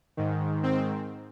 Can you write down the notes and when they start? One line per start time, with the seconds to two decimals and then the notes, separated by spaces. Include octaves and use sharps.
0.17 G#2 D#3
0.63 C4